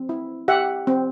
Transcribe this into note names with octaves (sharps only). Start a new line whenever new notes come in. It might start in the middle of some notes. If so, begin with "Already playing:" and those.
Already playing: C4
E4
G4 E5 F#5
C4